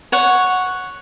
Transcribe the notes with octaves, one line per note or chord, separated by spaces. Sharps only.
C#5 F#5